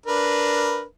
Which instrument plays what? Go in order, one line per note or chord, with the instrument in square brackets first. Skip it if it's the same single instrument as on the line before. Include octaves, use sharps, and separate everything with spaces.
[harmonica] D4 A#4 B4